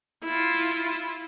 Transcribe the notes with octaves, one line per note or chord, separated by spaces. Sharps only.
E4 F4